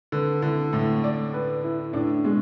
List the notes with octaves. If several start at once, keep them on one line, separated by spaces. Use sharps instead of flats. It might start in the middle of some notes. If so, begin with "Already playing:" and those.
D3 B4
D3 E4
A2 A3
D5
B4
E4
A2 D4
B2 G#3